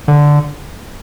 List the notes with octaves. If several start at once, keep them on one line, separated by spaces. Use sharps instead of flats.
D3